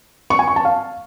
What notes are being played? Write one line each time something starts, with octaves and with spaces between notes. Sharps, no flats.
C#6
G#5
C#6
A5
F5